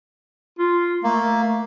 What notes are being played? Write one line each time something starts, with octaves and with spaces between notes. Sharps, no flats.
F4
A3 A#3